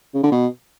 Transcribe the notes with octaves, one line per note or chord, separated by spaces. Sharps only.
C#3
D3
B2